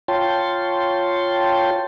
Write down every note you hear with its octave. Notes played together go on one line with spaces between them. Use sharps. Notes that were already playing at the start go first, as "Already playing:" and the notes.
F4 C#5 G5 A5 C6